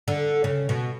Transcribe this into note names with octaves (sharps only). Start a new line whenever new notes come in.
D3
C#3
B2